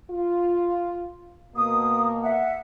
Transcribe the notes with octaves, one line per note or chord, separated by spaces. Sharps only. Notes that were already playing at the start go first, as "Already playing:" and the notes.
F4
B2 A#3 D#6
E5 F#5